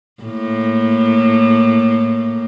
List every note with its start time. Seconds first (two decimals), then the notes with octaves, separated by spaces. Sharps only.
0.23 A2 A#3